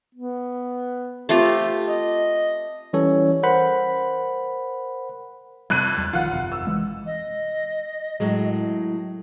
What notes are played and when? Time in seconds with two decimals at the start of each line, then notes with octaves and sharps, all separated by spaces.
0.14 B3
1.29 A3 C4 F4 G4
1.87 D#5
2.93 E3 G3 C#4 A4 C#5
3.43 A#4 C5 F#5 B5
5.70 F2 C3 G3 F#6 D#7
5.98 E2 G3
6.13 B1 D#3 F3 F4 F#5
6.30 G1 F2 C3
6.52 E6
6.67 E3 G#3
7.06 D#5
8.20 A2 F#3 G#3